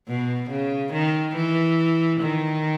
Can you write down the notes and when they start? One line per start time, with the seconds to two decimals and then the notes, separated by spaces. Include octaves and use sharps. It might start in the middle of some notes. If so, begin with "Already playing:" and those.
0.08 B2
0.50 C#3
0.93 D#3
1.36 E3
2.20 D#3